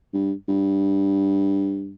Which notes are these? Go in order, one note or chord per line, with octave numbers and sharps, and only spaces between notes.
G2
G2